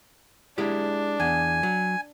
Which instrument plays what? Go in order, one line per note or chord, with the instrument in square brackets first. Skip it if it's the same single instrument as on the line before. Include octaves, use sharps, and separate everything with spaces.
[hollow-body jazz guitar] G#3 E4 G4 [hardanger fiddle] D4
[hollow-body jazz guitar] E2 [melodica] G#5
[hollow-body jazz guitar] F#3